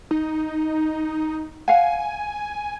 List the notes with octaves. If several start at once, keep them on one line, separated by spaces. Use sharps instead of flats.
D#4
F5 F#5 G#5